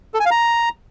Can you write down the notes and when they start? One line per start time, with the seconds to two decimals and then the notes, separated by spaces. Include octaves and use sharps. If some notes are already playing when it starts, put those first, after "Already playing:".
0.14 A4
0.20 G#5
0.25 F5
0.31 A#5